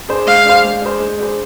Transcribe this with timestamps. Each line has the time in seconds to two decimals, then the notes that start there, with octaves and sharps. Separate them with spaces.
0.09 D4 G#4 C5
0.27 G#3 F5
0.46 D4 G#4 C5
0.64 G#3
0.82 D4 G#4 C5
1.00 G#3
1.19 D4 G#4 C5